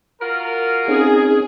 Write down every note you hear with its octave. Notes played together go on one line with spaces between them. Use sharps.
F4 F#4 A#4
C4 C#4 D#4 G#4